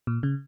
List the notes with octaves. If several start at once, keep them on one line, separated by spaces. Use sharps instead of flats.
A#2
C#3